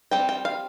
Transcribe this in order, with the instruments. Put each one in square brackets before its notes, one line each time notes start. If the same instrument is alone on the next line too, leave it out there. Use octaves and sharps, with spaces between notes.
[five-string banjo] G3 C4 G5
G5
F5